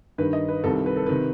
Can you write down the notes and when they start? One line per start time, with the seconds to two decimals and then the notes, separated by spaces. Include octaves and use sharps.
0.18 G2 D#3 B4
0.33 D#5
0.48 B4
0.64 C2 C3 D#3 A4
0.86 B4
0.96 A4
1.06 C3 D#3 B4